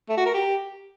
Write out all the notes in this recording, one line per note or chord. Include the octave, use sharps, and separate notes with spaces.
A3
F#4
A#4
G4